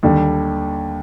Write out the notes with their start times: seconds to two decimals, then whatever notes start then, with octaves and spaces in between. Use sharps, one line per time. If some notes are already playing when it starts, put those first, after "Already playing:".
0.03 D#2 D3 G3